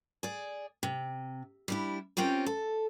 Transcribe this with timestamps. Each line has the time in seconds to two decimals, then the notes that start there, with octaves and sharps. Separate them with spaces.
0.23 G#4 D5
0.83 C3
1.68 G3 D4 E4
2.17 C4 C#4 F4 G4 A#4
2.46 A4